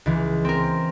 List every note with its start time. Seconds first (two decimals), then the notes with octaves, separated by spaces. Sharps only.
0.06 C#2 E3
0.45 C4 A#4